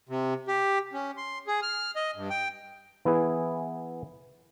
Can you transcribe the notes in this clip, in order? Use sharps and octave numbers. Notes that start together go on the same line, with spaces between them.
C3
G4
C#4
C6
G#4
F6
D#5
G2
G5
E3 B3 E4 G#4